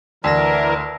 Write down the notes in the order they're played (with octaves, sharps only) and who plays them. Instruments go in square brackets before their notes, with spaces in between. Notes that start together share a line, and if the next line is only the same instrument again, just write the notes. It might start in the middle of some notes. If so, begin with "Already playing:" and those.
[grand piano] D2 [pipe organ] E3 A#4 [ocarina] D5 [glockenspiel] A5 E6 A#6